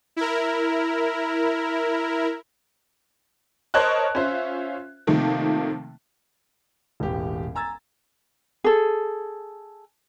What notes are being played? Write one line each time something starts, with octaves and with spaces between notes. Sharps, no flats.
E4 A#4
A#4 C5 C#5 D#5 A5 F#6
C#4 F4 C5 E5
C3 D#3 F3 A3 A#3
E1 A1 G4
G#5 A#5 E6 G#6 A6
G#4 A4